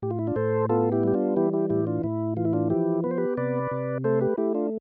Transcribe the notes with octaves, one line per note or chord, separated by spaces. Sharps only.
A2 G4
F4
E4
D4 F4
A2 A4 C5
B3 F4 A4
E4 G4
G3 G4
D4 F4
E3 E4 G4
E4 G4
A2 E4 G4
D4 F4
A2 E4
E3 F4
E4
D4 F4
F3 E4 G4
B3 B4
C5
G4 B4
C3 B4 D5
C3
A3 A4 C5
G4 B4
A3 E4 G4
D4 F4